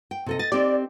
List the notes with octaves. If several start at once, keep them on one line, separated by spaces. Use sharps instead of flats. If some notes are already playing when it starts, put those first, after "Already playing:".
G5
C3 A4 D#5
D#5 A6
C4 D#4 G4 D5